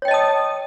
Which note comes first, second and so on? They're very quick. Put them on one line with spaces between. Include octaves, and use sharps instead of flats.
C#5 G5 D#5 A5 D#6